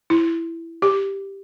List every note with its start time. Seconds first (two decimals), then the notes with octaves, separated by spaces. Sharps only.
0.10 E4
0.82 G4